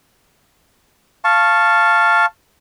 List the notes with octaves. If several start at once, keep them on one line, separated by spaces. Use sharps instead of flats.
F5 A5 C#6